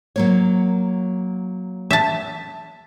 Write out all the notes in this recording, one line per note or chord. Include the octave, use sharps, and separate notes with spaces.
F#3 A#3 C#5
E5 A5